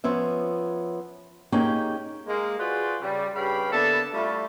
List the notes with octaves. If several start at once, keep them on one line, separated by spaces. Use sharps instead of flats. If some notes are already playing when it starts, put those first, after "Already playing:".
F3 B3 C#4 E5
A#3 C#4 D#4 G4 G#4 G5
G#3 A#3
F4 F#4 G#4 B4 C5 D5
C#3 G3
G2 C#3 G4 F5 G5 B5
D3 A#3 B3 A4 E5 A5
G3 A3 E4 F4